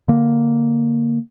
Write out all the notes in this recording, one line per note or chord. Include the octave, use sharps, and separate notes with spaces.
D3 A#3